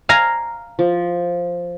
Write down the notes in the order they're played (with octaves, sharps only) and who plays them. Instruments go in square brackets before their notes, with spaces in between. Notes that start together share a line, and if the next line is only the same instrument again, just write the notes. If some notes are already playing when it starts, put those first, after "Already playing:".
[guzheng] F5 G#5 A#5
[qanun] F3